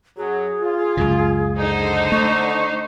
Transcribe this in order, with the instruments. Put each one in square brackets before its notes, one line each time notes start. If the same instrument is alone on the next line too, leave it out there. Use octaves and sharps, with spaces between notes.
[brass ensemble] F#2 F#3 [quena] G#4
[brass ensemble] F4
[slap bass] C#2 F#2 C#3
[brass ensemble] D3 [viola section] D#4 C5
[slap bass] A3 [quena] C#6